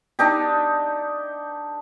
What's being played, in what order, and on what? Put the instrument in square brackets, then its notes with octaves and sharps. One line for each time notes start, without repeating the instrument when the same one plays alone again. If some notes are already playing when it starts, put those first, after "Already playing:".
[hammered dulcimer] D4 D#4 G4